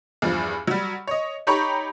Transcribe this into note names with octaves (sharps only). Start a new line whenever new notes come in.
E2 G2 F3
F#3 G3
C#5 D#5
D#4 G4 C#5 A#5 B5 C#6